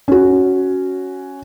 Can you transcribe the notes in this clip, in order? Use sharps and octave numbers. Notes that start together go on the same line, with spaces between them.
C#4 F#4